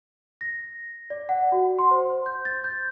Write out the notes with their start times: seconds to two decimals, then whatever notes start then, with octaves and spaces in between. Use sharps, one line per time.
0.41 A#6
1.10 D5
1.29 F#5
1.52 F#4
1.79 C6
1.91 C5
2.26 G6
2.45 A6
2.64 G6